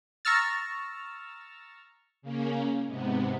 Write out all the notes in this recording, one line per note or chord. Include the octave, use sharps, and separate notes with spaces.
A#5 C#6 E6 F6 A6
C#3 A#3 C#4
G#2 C3 B3